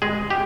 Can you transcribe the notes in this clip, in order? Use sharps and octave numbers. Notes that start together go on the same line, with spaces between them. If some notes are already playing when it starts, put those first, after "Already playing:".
G#3 G#4
G4